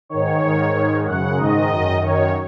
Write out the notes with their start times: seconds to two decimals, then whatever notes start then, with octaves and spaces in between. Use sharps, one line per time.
0.09 G#2 D#3 C#5
0.41 G#2 D#3
0.74 G#2 D#3
1.05 F#2 C#3 F#5
1.37 G#2 D#3 D#5
1.70 F#2 D#3
2.02 F#2 D#3 C#5